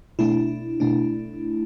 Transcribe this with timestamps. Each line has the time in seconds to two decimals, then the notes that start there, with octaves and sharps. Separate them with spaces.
0.19 B2 A3 D4 E4
0.80 B2 A3 D4